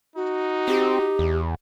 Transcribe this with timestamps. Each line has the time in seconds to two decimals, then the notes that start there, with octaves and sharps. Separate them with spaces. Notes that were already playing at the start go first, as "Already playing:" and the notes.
0.16 D#4 F#4
0.68 C4 G4
1.19 E2